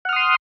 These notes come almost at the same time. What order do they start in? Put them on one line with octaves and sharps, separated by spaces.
F#5 F6 D#6 C6